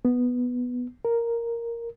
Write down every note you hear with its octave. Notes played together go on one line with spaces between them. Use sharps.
B3
A#4